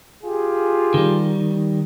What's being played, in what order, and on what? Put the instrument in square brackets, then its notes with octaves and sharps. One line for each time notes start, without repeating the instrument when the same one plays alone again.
[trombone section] F4 G4 G#4
[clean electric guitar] D#3 G3